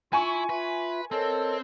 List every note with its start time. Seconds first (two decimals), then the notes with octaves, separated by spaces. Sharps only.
0.13 E4 F4 G#5 C#6
0.49 F4 B4 E5
1.12 C4 A4 A#4 C#5 D#5